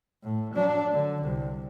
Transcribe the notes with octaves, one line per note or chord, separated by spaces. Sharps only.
A2
F#3 D4
D3
C2